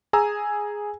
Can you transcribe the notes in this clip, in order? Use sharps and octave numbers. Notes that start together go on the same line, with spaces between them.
G#4 G#5 A#5 E6